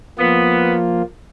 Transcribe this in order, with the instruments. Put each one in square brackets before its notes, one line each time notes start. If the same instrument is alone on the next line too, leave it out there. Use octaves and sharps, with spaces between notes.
[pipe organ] F3 A#3 F4 [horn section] B3